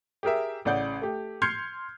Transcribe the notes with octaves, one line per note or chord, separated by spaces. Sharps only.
G4 G#4 A#4 E5
A1 C#3 D5 F#5 G6
A3 G4
C6 F6 G6 G#6 C7 C#7